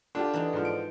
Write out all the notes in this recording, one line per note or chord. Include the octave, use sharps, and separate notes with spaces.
D3 D4 F4 G4
E3 D#4
G#2 F3
D7